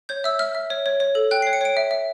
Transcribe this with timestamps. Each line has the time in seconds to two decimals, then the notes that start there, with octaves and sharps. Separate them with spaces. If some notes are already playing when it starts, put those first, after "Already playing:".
0.09 C#5 G6
0.24 E5 E6
0.39 E5 F6
0.55 E5
0.70 C#5
0.86 C#5
1.00 C#5
1.15 A4
1.31 G5 F#6
1.42 C#5 C7
1.53 C#7
1.61 C#5 D7
1.77 E5
1.91 E5